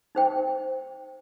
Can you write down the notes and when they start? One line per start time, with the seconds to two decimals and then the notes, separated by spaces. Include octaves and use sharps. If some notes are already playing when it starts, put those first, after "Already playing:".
0.15 D#4 C5 G5